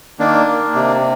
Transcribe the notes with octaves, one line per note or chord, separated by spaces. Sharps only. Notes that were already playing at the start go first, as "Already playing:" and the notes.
D#3 A#3 D4
A#3
C3